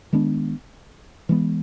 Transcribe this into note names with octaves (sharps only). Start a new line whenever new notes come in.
D#3 G#3 B3 D4
E3 G#3 B3